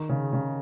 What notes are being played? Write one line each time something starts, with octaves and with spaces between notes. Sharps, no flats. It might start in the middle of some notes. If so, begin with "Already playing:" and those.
Already playing: D#3
C#3
C#3